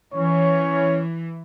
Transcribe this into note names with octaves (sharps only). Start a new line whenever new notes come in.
E3 C#4 C#5